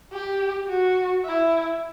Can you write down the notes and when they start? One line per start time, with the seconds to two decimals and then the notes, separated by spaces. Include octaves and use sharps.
0.12 G4
0.68 F#4
1.25 E4